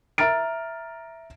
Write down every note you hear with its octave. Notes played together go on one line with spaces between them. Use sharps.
E5 A#5 F6 A6 D7